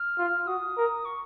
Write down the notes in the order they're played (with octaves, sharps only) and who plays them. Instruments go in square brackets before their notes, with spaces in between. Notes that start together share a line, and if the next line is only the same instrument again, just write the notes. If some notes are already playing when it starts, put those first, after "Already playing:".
Already playing: [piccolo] F6
[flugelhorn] F4
[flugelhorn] F#4 [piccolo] D#6
[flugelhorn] A#4
[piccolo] C#6